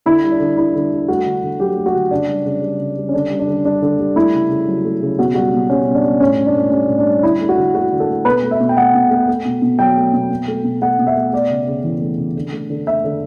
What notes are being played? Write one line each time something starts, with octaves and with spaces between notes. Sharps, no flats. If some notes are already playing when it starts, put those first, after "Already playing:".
D3 E4
G3
D4
D3
G3 E4
D3
G3
A3 F#4
D3
D3
F#3 G4
A3
F#4
D3
C#3 D4
G3
C#3
G3
C#3
G3
C#4
D3 D4
G3
D4
D3
G3 D4
D3
G3
A3 E4
C#3
C#3
F#3
A3
C#3
B2 F#4
G3 F#4
B2
G3 C#4
B2
D4
G3
A2 C#4
G3
D4
A2
G3 C#4
A2
D4
G3
D3 E4
A3
F#4
D3
A3 F#4
D3
A4
A3
B2 B4
A3
E5
B2
G5
A3 F#5
B2
A3
A3
B2
B2
F#3 G5
A3
B2
B2
A3
B2
A3 F#5
B2
E5
A3
A3 D5
C#3
C#3
E3
A3
C#3
D3
A3
D3
A3 E5
D3